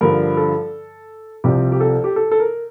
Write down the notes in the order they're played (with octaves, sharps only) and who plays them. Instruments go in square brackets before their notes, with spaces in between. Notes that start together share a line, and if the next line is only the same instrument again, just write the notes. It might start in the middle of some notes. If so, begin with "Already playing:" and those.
[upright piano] G2 D3 F3 A#4
A4
C2 C3 F3 G4
G4
A4
G4
A4
A4
A#4